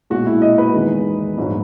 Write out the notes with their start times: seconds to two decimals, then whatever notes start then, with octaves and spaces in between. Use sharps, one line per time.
0.10 B1 A#2 G#3 F#4
0.26 E4
0.42 D#5
0.58 B4
0.73 E2 D#3 G#3
1.38 A#1 G#2 F#3